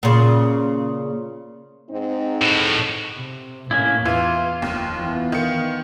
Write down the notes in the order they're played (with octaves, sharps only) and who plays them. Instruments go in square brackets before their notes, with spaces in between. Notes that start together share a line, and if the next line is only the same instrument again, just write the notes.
[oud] A#2 C#3
[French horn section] G#2 C4 D#4
[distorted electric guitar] A2 F#4
[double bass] C3
[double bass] A2 [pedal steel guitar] A#3 C#4 E4
[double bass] E2 [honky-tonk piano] E3 [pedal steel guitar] F4
[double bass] F1 [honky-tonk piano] D#2
[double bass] E3 B3
[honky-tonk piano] D#3 C#7